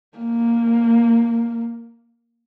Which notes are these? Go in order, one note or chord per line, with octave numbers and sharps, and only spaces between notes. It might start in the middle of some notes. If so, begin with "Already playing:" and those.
A#3